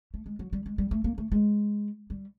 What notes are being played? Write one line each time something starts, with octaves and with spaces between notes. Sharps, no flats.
A3
G#3
F#3
G3
G#3
G3
A3
A#3
A3
G#3
G3